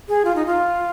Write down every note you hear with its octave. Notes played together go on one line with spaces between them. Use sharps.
G#4
F4
D#4
F4